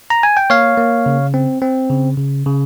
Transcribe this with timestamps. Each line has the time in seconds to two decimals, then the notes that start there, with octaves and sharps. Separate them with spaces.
0.10 A#5
0.23 G#5
0.37 G5
0.50 A#3 C#5 F5
0.77 A#3
1.06 C#3
1.34 C4
1.62 C4
1.90 C#3
2.17 C#3
2.46 C#3